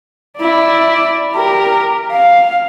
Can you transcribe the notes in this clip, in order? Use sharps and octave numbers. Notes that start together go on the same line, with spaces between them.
E4 D5
G4 A#4
F5